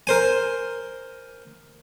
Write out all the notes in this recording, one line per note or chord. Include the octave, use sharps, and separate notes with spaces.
A#4 C5 G#5